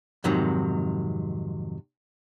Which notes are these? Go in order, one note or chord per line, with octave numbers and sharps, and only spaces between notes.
F2 G#2 C3 D#3 F#3